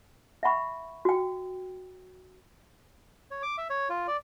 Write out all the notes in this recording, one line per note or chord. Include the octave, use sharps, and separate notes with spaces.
E5 F#5 B5 C#6
F#4 G5
C#5
D6
E5
C#5
F4
D5